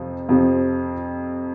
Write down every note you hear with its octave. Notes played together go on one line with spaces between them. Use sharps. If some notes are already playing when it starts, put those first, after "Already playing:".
Already playing: F2 C3 F3
F2 C3 F3